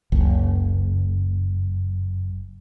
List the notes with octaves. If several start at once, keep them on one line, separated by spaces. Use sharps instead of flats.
F#1 C#2